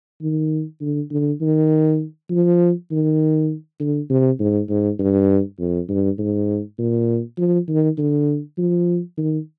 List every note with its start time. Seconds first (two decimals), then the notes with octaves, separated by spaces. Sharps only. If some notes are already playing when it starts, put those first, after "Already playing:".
0.22 D#3
0.81 D3
1.11 D3
1.41 D#3
2.30 F3
2.91 D#3
3.80 D3
4.10 C3
4.39 G#2
4.69 G#2
4.99 G2
5.59 F2
5.89 G2
6.18 G#2
6.79 A#2
7.38 F3
7.68 D#3
7.98 D3
8.58 F3
9.17 D#3